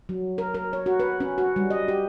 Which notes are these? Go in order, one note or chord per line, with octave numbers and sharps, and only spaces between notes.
F#3
A#4
A#4
C#5
F#4
B4
C#4
F#4
G3
D#5
G4